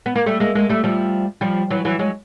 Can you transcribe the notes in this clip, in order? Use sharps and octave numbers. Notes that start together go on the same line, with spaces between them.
B3
A#3
G3 A3
G#3 A#3
G#3 A#3
G3 A3
F3 G3
F3 G3
E3 F#3
E3 F#3
F#3 G#3